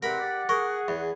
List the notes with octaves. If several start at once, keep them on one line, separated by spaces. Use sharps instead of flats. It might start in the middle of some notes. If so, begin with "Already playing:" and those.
E2 C3 C4 A#4 F#5 B5
G4 D5
G#4 A#4 C#6
E2 B5